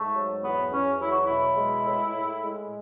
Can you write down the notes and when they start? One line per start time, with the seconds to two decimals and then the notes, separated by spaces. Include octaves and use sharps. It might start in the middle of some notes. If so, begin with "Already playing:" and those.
Already playing: G#2 A3
0.14 F#3
0.43 E2 B3
0.72 E2 C#4
1.00 F#3 E4
1.12 F#4
1.25 B2 E4
1.57 G#3
1.85 A2
2.14 A2
2.42 G#3